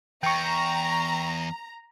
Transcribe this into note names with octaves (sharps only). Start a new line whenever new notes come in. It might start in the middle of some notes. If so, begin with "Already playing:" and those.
E2 G5 A#5 C#6